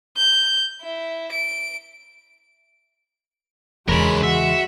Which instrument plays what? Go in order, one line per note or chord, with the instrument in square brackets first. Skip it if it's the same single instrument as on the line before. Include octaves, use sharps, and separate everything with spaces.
[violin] G6
E4
D7
[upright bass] E2 C#3 [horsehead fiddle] G#3 [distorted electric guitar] A#4 C#5 [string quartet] B5
[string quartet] F#4 [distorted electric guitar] E5